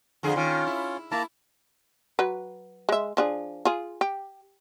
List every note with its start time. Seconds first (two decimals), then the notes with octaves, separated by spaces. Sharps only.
0.23 F2 D3 G#4
0.36 D#3 C#4 F4
0.67 E4
1.12 A#3 E4 A5 A#5
2.19 F#3 B4
2.89 G#3 E5
3.17 F3 D4 G#4
3.65 F4 G#4
4.01 G4